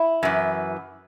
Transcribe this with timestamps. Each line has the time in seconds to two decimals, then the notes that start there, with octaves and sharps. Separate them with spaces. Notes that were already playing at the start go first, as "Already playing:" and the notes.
Already playing: E4
0.23 F#2 E3